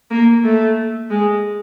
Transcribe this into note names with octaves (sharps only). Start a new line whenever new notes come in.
A#3
A3
G#3